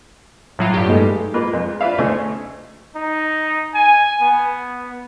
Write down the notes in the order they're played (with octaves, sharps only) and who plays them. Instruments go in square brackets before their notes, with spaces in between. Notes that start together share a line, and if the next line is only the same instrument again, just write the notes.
[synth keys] A2 F#3 F4
G2 G4
[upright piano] G#3 A3 D#4
[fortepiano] G#3 A#3 F4 B4
F2 G#3
F4 B4 D5 E5 F5
D2 A3 C#4 D#4 G#4
[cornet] D#4
G#5
B3